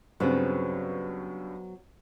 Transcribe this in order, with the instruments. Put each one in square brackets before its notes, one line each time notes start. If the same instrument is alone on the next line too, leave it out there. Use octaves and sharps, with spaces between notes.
[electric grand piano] G2 C#3 [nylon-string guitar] F#3 B3 C4